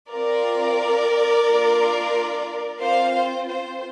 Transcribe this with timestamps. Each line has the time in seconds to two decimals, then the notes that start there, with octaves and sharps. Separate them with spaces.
0.10 C4 F4 A#4 D5
1.46 A#3 D4 F4
2.80 C4 F4 C5 F5
3.14 C5
3.48 C5